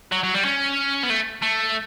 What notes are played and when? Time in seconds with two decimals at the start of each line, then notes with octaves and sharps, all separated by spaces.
0.12 F#3
0.24 F#3
0.34 G3
0.45 C#4
1.03 B3
1.10 A3
1.43 A3